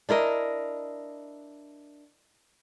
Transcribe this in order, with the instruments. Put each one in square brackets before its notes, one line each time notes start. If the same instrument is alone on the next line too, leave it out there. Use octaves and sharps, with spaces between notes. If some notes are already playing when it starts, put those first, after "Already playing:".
[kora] D4 E4 A#4 D#5